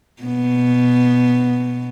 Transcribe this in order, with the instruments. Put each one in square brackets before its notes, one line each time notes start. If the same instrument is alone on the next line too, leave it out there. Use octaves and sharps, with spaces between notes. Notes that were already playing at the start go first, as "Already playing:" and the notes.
[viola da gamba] B2 B3